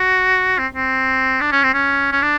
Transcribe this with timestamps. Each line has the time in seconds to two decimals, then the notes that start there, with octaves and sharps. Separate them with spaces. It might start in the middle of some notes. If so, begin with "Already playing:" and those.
Already playing: F#4
0.59 C4
0.75 C4
1.41 D4
1.52 C#4
1.63 C4
1.74 C#4
2.12 C#4
2.22 D4